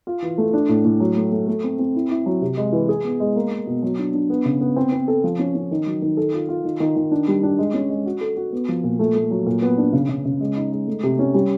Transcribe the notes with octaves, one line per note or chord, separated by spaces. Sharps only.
F4
E3
A3
D4
A2
A2
F#3
A3
A3
A3
C4
C4
E4
E4
F#3
C3
G#3
E3
G#4
B3
G#3
A#3
A#3
B2
F#3
D4
D4
B3
C#3
B3
C4
C4
A4
F3
C#4
C#4
D#3
F#3
D#3
A4
F4
F4
D#3
D#3
D#3
D4
G3
D4
G#3
C#4
G#3
F#4
A4
F#4
B3
F3
A#2
A3
A3
F#3
A#2
B3
D4
C#3
C#3
C#3
G#3
D#4
G#3
A3
C3
C#4
G3